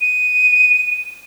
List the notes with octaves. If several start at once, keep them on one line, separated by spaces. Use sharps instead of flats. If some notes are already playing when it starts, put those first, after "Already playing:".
D#7